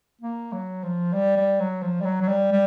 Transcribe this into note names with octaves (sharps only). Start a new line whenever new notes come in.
A#3
F#3
F3
G3
G3
F#3
F3
G3
F#3
F#3
G3
G3